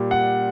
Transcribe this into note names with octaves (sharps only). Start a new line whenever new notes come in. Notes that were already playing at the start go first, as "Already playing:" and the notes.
Already playing: A#2 G3
F#5